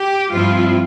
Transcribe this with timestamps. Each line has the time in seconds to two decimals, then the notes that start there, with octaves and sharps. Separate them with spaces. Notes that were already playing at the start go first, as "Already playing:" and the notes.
Already playing: G4
0.31 G2 F3 C4 E4 F4